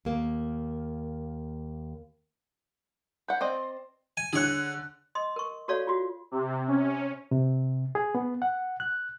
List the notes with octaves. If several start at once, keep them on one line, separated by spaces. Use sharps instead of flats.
D#2 A#3
B4 F#5 G6
C4 D5 D#5 C6
G#5
D3 G#4 C#5 F#6
D#5 C6 D#6
A#4 C#6
F#4 A4 C#5 D5 F5
F4 F#4
C3
C#4
C3
G#4
B3
F#5
F#6